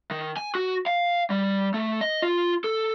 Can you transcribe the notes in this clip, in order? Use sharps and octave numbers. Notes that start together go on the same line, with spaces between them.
D#3
G#5
F#4
F5
G3
A3
D#5
F4
A4